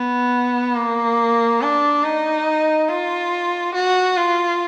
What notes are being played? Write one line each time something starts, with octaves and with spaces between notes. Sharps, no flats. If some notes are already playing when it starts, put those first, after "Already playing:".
Already playing: B3
A#3
D4
D#4
F4
F#4
F4